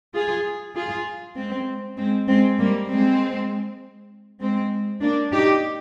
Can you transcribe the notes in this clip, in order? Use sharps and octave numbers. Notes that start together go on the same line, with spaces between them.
F4 G#4
F4 G#4
G#3 C4
G#3 C4
G#3 C4
G3 A#3
G#3 C4
G#3 C4
A#3 D4
D#4 G4